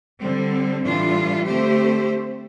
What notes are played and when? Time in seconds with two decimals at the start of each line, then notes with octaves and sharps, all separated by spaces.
0.20 D3 G3 C4
0.82 A2 E3 G3 D4 F4
1.45 D3 A3 C4 G4 C5